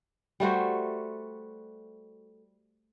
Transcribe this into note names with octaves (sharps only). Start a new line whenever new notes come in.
G3 A3 F#4 C5